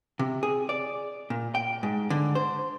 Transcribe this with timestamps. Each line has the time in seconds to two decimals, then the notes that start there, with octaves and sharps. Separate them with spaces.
0.19 C3
0.43 G#4
0.69 D5
1.30 A#2
1.55 G5
1.83 G#2
2.10 D3
2.35 C5